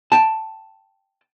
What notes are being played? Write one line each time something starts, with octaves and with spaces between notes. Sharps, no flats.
G5 A5